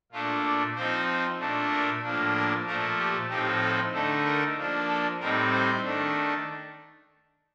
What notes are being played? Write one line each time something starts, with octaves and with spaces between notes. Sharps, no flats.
A#2 A3 D4 F4
D5
F3 C4 D#4 C5
A#2 A3 D4
A#4
A2 F3 A#3 D4
A#4
A#2 F3 A3 A#4
G4
A2 F3 C4 D#4 G4
A4
D3 A3 D#4 A4
A#4
F3 A#3 D4
A4
A2 G3 C4 D#4 A#4
C5
D#3 A3 D4